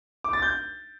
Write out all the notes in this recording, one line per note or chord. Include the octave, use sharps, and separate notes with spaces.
D6
A6
G6